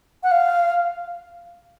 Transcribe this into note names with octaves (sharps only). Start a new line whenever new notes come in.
F#5
F5